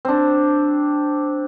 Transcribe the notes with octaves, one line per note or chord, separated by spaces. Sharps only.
C4 D4